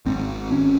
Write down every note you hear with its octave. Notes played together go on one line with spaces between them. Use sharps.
G#1 G#2 C4
G#1 C#4